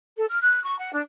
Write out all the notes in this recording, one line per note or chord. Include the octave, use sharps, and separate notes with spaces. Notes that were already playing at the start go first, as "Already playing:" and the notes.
A4
F6
F#6
C#6
F#5
D4